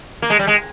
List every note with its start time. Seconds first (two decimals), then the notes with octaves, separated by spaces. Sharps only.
0.22 A#3
0.30 G#3
0.39 G3
0.47 G#3